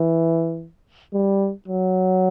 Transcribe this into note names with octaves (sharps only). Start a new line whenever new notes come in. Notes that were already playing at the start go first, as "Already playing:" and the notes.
Already playing: E3
G3
F#3